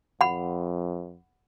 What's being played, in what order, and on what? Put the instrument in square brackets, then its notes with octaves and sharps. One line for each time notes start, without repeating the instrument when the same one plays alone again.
[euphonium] F2 [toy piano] F#5 B5